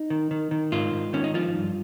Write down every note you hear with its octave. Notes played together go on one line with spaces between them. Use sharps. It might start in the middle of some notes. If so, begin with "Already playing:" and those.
Already playing: D#4
D#3
D#3
D#3
G#2 F4
G#2
D#3 C#4
D#4
F3 F4
G2